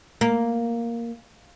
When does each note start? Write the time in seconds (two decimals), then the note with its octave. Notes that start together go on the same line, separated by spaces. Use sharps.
0.21 A#3